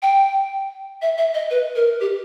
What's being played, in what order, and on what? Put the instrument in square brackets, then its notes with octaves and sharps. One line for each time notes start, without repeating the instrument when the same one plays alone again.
[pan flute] G5
E5
E5
D#5
B4
A#4
G4